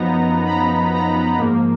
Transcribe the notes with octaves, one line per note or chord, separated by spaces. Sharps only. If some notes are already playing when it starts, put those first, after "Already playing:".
Already playing: F#2 F3 B3 D#4 A#5
B5
A#5
A#5
G#2 F3 A#3